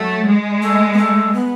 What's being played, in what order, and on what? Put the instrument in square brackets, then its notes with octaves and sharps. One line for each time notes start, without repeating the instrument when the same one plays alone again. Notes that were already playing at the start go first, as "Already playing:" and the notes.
Already playing: [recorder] F#3 [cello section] A3
[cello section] G#3
[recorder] A3
B3
A3
B3